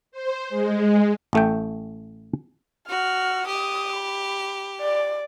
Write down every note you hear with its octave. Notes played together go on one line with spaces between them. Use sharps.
C5
G#3
A1 A3 G5
F#4 F6
G4 D#6
B5
D5